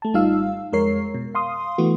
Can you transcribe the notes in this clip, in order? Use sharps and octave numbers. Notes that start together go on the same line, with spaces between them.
A3 A5
G#1 G3 D#4 F4 F5 E6
F2 G#3 A#4 C#5 C7
B2
F5 C6 D#6
E3 A3 B3 F#4